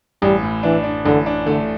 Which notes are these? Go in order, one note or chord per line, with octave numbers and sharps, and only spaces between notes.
A1 G3
A2
E3 D4
D4
A1 D3
D4
D3 A3